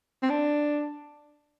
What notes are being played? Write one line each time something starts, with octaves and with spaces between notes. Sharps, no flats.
C4
D4